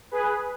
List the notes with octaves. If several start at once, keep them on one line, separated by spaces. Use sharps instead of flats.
G#4 B4